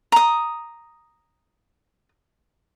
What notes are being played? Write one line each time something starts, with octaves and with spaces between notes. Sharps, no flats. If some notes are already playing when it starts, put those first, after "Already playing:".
A#5 D#6